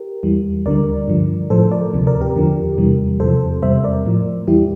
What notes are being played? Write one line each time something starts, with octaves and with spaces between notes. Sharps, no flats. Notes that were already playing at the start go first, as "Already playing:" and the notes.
Already playing: G4 A#4
E2 E3 G3
D2 D3 G3 A#4 D5
G2 D3 F3
A2 F3 A4 C5
A#4 D5
D2 C3 F3
A#4 D5
G4 A#4
E2 D3 F3
E2 C3 E3 G3
E2 C3 F3 A4 C5
E2 C3 G3 C5 E5
A#4 D5
A2 F3
E2 E3 G3 E4 G4